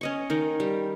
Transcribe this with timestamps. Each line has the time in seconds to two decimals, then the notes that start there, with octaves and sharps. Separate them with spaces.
0.01 C#4 D#5 C#6
0.30 D#3 A#4
0.60 G3